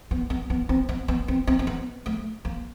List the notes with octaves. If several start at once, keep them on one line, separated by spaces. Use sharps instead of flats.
B3
B3
B3
C4
B3
B3
C4
C4
C4
B3
A3
A#3